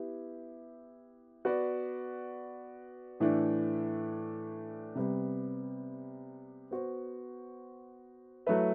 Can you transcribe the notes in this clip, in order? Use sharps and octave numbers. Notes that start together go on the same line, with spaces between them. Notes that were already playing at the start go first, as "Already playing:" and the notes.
Already playing: B3 E4 G4
B3 F#4 B4 D5
A2 E3 A3 D4
C3 G3 B3
B3 F#4 C5
F#3 A3 E4 B4 E5